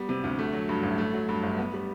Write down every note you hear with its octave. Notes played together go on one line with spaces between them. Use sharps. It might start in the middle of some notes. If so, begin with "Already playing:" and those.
Already playing: G3 B3
C3
D2
A3
F#3
G2
A1
A3
F#3
G2
G1
B3
G3